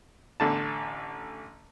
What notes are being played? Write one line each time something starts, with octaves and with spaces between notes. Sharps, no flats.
A1 D3 A5